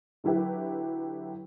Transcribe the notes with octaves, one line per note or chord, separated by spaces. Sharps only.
D3 F#3 E4 G4 B4